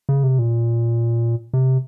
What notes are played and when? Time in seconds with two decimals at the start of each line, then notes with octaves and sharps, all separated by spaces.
0.09 C#3
0.24 C3
0.39 A#2
1.54 C3